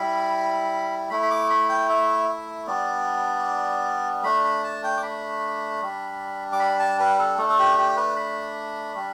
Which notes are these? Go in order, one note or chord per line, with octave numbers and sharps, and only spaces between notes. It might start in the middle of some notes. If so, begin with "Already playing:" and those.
Already playing: G3 E4 B5
A3 E4 B5
B5
D6
B5
G5
E5
E5
G3 B3 D4 D5
A3 D4 B5
B5
A5
G5
D6
B5
G3 D4
D6
B5
A5
B4
A4
A3 D4 A4
A4
G4
G4
B4
B5
G3 D4